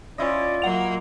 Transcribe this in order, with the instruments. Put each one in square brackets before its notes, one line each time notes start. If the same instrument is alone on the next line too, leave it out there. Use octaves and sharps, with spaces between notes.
[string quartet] C#4 [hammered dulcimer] E4 F4 D#5 [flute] D5
[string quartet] F#3 A#3 [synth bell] F#5 F7